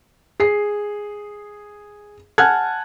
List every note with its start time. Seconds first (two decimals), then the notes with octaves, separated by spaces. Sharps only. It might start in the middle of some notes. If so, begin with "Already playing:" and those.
0.40 G#4 C7
2.38 F#5 G#5 A5 F6 F#6 G#6